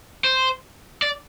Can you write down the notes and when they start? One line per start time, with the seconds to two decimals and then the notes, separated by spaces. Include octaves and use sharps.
0.24 C5
1.02 D5